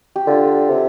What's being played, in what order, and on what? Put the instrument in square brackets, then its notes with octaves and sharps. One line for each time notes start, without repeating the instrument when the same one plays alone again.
[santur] G4
[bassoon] D3 [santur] F4
[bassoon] C3